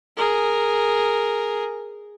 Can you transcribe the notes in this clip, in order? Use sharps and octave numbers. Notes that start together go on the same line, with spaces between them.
G#4 A#4